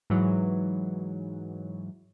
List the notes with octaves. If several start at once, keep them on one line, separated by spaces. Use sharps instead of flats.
G#2 E3 F#3